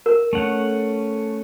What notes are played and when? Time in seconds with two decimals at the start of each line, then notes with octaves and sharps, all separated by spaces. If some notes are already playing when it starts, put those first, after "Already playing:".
0.06 A#4
0.33 A3 C#4 F#5